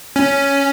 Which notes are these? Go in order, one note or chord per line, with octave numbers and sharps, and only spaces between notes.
C#4